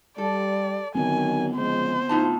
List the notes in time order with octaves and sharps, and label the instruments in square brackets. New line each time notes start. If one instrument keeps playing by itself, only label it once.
[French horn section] G3 [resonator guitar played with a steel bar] A4 [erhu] D5
[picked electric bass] D3 B3 C4 [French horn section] D#3 F#3 [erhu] G#5
[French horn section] C#3 F3 G#3 [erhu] C5
[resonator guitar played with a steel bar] A2 D#4 A5 [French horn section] F4